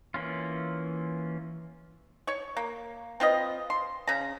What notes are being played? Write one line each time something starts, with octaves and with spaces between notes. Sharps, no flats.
E3 A#3 C#4 F4
C#5 C#6
A#3
C4 F4 B4 D#5
C6
C#3 A#5